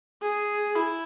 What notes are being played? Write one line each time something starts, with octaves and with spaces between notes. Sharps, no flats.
G#4
E4